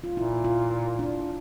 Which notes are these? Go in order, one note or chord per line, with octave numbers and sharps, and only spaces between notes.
F4
A#2 E4
F4
D4